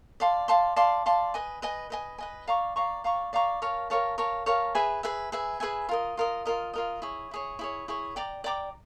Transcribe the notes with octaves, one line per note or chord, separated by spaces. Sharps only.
D5 F5 A5 C6
D5 F5 A5 C6
D5 F5 A5 C6
D5 F5 A5 C6
B4 D#5 G#5
B4 D#5 G#5
B4 D#5 G#5
B4 D#5 G#5
D5 F5 A#5 C#6
D5 F5 A#5 C#6
D5 F5 A#5 C#6
D5 F5 A#5 C#6
A#4 C#5 F5 A5
A#4 C#5 F5 A5
A#4 C#5 F5 A5
A#4 C#5 F5 A5
G#4 B4 E5 G#5
G#4 B4 E5 G#5
G#4 B4 E5 G#5
G#4 B4 E5 G#5
F4 A#4 D#5
F4 A#4 D#5
F4 A#4 D#5
F4 A#4 D#5
E4 G#4 C#5
E4 G#4 C#5
E4 G#4 C#5
E4 G#4 C#5
D5 G5 A#5 D6
D5 G5 A#5 D6